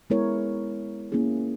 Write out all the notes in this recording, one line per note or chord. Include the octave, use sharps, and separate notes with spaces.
G#3 B3 E4 A#4 C#5
A#3 C#4 E4 G#4